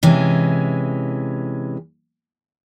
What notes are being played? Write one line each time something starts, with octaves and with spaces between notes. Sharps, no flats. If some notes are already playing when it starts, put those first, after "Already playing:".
C3 E3 G#3 C#4